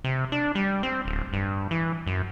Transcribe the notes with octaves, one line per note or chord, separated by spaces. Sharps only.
C3
D4
G3
C4
D1
G2
E3
F#2